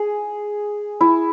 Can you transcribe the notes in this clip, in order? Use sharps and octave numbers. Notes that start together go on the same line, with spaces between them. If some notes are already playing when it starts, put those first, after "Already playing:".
Already playing: G#4
E4